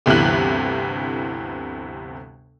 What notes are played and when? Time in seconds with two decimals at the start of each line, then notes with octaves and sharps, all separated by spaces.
0.06 G1 D2 C3 E3 F#6